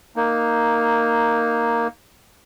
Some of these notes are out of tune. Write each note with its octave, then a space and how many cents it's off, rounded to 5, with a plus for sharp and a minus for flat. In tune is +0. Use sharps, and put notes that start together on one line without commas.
A#3 +0 D#4 +0